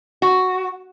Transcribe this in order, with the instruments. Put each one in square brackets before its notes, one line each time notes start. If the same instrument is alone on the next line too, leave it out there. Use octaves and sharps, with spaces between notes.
[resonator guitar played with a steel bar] F#4